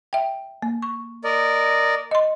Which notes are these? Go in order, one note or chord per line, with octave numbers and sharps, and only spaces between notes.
E5 G5
A#3
C#6
A#4 D5 D#5
D#5 C6